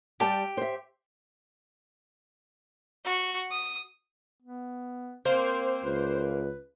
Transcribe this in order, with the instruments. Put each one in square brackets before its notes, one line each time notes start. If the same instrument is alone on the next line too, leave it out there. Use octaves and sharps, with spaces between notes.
[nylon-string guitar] G3 G5 A5 [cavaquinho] G4
[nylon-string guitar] C5 E5
[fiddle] F#4
D#6
[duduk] B3
[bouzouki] A#3 [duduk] C4 [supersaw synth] C5
[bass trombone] C#2 [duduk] B4